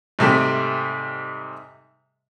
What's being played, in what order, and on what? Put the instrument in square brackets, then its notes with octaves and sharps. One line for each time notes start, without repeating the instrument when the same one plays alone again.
[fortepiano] G#2 C3 G3 A3